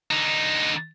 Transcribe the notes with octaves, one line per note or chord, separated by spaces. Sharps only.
D3 D#4